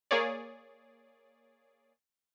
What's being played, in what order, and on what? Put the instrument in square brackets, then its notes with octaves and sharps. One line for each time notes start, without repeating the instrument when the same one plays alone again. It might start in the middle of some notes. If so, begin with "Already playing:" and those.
[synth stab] A#3 G#4 C#5 D5